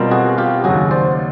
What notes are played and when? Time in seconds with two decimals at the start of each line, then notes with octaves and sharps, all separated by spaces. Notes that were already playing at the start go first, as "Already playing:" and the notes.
Already playing: B2 G3 C4 F4 A#4
0.11 F#4 G#4
0.38 F4 G4
0.64 D#2 C#3 F#3 F#4 G#4
0.91 C5 D5